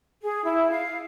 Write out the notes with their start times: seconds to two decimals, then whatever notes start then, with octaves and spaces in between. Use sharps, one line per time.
0.21 G#4
0.45 E4
0.70 F5